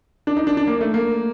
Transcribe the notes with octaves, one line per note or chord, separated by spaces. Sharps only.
D4
D#4
D4
D4
A#3
A3
A#3